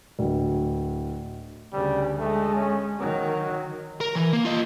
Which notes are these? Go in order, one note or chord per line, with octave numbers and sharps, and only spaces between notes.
D1
D2 C#3 G3
G#3 A3
C#4
D#3 F#3
A#4
E3
A#3
F4 D#5